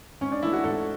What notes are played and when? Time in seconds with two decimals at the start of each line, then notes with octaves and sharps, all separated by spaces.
0.21 G#2 C#4
0.32 D4
0.42 E3 A3 E4
0.53 F#4
0.64 G#2 A4